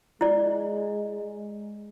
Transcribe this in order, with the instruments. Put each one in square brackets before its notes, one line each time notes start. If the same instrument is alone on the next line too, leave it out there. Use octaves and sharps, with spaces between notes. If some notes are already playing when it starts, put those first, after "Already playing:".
[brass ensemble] G#3 [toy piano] E4 D5